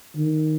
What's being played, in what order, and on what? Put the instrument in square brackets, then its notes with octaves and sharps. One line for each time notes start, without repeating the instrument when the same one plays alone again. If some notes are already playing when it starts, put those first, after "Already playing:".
[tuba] D#3